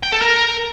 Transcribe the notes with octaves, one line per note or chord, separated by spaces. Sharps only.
G5
A4
A#4